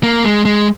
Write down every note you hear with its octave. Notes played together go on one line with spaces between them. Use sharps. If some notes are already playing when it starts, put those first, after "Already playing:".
A#3
G#3
G#3